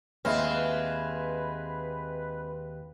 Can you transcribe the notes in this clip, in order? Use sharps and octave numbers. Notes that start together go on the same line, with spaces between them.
D#2 G#3 C4 B4 E5 F6